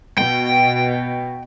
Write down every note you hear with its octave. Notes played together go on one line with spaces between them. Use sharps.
B2 G5